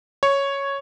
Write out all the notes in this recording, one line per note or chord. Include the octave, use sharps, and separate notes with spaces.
C#5